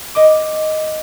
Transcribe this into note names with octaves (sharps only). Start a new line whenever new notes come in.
D#5 D6